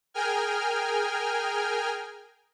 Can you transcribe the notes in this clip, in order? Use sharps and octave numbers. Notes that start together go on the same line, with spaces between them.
G#4 A#4 G5 G#5 F6